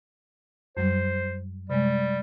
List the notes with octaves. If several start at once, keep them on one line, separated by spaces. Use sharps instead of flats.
F#2 F#3 G3 C5
C3 G3 G#3